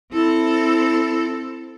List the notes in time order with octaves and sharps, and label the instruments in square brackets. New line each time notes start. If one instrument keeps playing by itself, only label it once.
[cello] C4 A4 [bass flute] E4